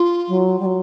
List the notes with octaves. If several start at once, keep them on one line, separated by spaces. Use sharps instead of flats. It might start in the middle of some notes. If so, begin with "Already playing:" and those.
Already playing: F4
F#3
G3
F#3